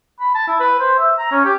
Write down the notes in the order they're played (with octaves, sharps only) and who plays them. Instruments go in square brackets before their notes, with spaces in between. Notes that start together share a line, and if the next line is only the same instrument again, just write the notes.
[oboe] B5
A5
E4
B4
C5
E5
A#5
C#4
G4